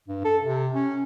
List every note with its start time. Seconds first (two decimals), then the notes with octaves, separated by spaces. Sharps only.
0.08 G2
0.25 A4
0.43 C3
0.73 C#4